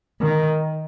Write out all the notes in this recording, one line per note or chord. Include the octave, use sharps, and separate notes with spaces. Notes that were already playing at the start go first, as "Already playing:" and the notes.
D#3